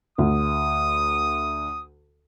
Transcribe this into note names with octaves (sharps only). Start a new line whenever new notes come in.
D2 D#6